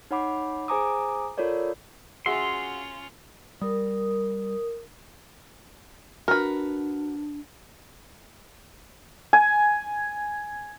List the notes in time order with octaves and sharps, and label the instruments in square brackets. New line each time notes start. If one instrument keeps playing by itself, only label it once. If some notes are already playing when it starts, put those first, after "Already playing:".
[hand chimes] D#4 C#5 F#5 B5 D6
G#4 C5 G#5 A#5 D6 D#6
F4 A4 A#4 C#5 D5
[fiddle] C#4 F4 [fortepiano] F#4 G#4 E5 [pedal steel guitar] C6
[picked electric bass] G3 [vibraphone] A#4 D#6
[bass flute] D4 [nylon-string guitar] F#4 [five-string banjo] A#4 B4
[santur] G#5